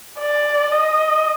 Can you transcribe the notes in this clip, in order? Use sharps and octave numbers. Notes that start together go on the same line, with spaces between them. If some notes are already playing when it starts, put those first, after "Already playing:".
D5
D#5